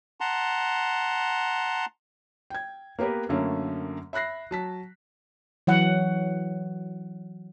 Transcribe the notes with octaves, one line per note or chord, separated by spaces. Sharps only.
F#5 A5 A#5 C6
G5 G#6
A#3 B3 G4 A#4 B4
F#2 D3 F#3 A3 A#3 C#4
E5 B5 F#6 A#6 C7
F#3 A5 B6
E3 F#3 F#5